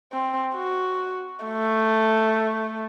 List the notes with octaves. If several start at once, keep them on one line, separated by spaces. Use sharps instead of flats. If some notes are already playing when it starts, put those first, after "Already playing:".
C4
F#4
A3